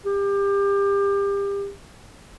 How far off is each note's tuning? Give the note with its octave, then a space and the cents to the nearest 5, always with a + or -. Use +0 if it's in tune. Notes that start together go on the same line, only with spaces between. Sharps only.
G4 +30